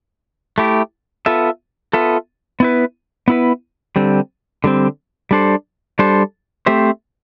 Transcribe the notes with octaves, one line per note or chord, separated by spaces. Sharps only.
A3 E4 G4
B3 F4 A4 E5
B3 F4 A4 E5
B3 E4 B4
B3 E4 B4
D3 G3 C4
D3 G3 C4
G3 D4 A4 C5
G3 D4 A4 C5
A3 C4 G4 C5 E5